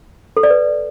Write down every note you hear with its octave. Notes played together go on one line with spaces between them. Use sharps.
A4
D5
B4